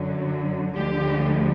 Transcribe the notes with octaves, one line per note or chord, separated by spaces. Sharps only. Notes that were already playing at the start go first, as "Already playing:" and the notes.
Already playing: F#2 D3 F#3
D2 D3 F3 G#3 G4